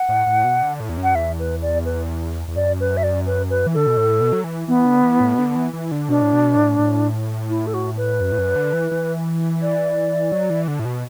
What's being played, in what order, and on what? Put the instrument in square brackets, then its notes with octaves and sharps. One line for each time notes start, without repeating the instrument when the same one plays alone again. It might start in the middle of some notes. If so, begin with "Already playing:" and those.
Already playing: [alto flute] F#5
[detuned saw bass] A2
A2
B2
D3
A2
E2
F#2
[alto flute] F#5
[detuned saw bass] E2 [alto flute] E5
[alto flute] B4
D5
B4
[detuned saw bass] E2
[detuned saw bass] F#2 [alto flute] D5
[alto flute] B4
E5
D5
B4
B4
[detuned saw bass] E3
[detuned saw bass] D3 [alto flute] A4
[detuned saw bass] B2
A2
B2
F#3
E3
[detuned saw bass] E3 [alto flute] B3
[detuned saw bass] D3
E3
A2
B2
D3
E3
E3
D3
[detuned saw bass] B2 [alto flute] D4
[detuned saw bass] A2
B2
A2
A2
[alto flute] E4
A4
F#4
B4
[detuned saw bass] F#2
A2
F#2
D3
E3
E3
[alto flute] D5
[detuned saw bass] F#3
E3
D3
A2
B2